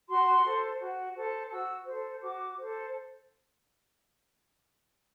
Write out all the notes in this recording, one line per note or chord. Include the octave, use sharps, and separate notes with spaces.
F#4 C6
A4 C5
F#4
A4 C5
F#4 E6
A4 C5
F#4 D6
A4 C5